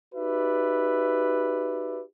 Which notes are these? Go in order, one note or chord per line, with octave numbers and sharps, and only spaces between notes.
D#4 F#4 G4 B4 D5 E5